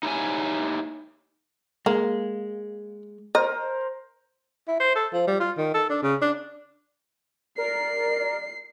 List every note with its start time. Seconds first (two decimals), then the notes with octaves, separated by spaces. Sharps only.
0.03 D#4 E4 G4 C#5 G#5
1.86 G#3 A#3
3.35 A#4 C5 D#5
4.68 E4
4.80 C5
4.96 A4
5.13 F3
5.27 G3
5.40 F4
5.57 D#3
5.74 A4
5.90 D4
6.03 C#3
6.21 D4
7.58 A#4 D5 C7